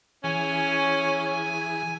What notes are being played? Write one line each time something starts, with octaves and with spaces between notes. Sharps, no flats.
E3 C#4 G#4 G#5